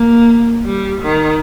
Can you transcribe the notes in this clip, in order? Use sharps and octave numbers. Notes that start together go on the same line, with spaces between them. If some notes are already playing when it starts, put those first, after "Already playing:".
Already playing: A#3
G3
D#3